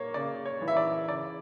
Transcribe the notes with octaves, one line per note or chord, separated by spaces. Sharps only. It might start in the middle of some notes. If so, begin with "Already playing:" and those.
Already playing: A#3 C#5
C#3 D5
C#5
E3
E5
D5
C#3 D5